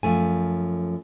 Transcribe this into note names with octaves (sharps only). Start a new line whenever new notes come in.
F#2 F3 A3 G#5